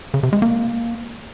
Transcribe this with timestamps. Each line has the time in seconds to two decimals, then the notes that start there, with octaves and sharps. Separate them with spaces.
0.14 C#3
0.23 C3
0.33 G#3
0.42 A#3